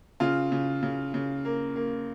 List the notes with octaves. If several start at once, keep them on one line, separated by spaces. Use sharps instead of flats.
C#3 F4
C#3
C#3
C#3
A#3
A#3